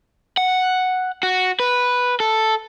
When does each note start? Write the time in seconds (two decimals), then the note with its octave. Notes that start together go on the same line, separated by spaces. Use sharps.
0.37 F#5
1.23 F#4
1.60 B4
2.20 A4